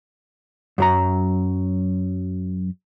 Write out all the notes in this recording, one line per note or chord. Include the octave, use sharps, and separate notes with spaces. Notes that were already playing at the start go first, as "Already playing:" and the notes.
F#2 F#3 A#5